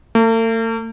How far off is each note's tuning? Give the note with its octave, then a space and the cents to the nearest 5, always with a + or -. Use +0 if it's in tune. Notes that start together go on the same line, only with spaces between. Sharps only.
A3 +45